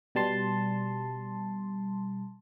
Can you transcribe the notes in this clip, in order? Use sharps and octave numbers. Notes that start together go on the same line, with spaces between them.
B2 G3 A5 C6